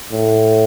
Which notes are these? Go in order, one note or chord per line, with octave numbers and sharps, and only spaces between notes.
A2